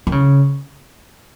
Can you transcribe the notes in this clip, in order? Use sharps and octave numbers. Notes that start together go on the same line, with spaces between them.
D#3
C#3